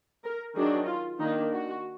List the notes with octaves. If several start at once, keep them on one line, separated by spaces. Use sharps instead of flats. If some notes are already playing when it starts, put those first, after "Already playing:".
A#4
D#3 F#3 D4 G#4
F4
D#3 A#3 D4 D#4
F#4